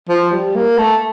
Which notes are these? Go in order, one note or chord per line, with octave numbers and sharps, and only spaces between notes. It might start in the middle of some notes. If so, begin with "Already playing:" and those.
F3
G3
A#3
A3